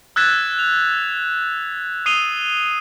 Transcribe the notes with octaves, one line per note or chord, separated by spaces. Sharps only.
E6 F#6 G#6 A6 B6 E7
F7
D#6 C7 D#7 F7 G7